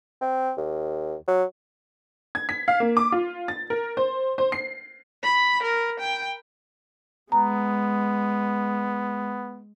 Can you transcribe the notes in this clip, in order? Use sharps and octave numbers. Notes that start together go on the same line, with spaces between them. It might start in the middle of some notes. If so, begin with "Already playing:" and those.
C4
D#2
F#3
G#6
B6
F5
A#3
D6
F4
A6
A#4
C5
C5
C7
B5
A#4
G5
G#3 B3 A#5